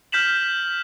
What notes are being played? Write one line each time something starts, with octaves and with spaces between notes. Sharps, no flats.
F6 G6 B6 E7 F#7